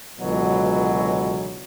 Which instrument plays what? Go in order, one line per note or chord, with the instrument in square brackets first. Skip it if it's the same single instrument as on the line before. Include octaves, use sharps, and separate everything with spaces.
[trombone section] C#2 B2 D3 E3 F#3